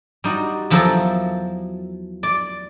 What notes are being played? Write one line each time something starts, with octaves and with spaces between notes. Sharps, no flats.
G3 D#4 F#4
E2 F3 F#3 A4 A#4
D5